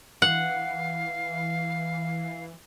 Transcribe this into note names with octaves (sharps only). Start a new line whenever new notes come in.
E3 F5 F#5